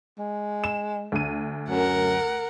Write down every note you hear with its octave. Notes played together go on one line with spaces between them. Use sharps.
G#3
E7
D2 D#7
F#2 A#4 F#5